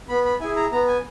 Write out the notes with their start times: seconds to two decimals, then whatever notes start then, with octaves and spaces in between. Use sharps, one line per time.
0.09 B3 B5
0.25 B5
0.40 E4 G#4 G#5
0.56 A#5
0.72 B3 A#5
0.88 G#5